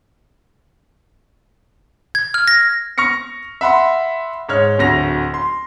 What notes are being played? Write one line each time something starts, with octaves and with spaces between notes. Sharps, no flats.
G#6
F6
A#6
C#6 F6 A#6 C#7
E5 F#5 B5 C6
G#2 C#5 F6
D1 D2 A#6 F7
C6